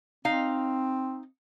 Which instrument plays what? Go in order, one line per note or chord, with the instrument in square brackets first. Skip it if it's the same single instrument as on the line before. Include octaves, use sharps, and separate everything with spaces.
[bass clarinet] C4 [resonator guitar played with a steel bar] D#4 F5